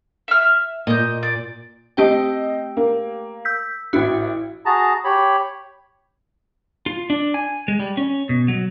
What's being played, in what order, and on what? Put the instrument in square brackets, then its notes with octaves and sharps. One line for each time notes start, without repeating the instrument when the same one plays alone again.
[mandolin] E5 F6
[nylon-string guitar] A#2 [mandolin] D#5 G6
[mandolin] D5
[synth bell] A3 G4 G5 [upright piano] C4 D#5
[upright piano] A#3
[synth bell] E6 G6 B6
[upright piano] A1 E4 [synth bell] F#4
[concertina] F#4 G#4 A5 A#5
G4 C#5 B5
[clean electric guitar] F4
D4
G#5
G#3
G3
C#4
B2
F#3